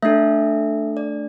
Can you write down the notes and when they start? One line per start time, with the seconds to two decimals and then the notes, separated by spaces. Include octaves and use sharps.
0.02 A3 D4 A4 E5
0.97 D5